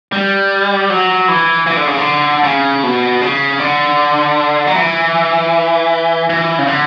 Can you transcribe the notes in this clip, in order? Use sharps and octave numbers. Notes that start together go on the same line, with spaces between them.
G3
F#3
E3
E3
D3
C#3
D3
C#3
B2
C#3
D3
F#3
E3
E3
C#3
D3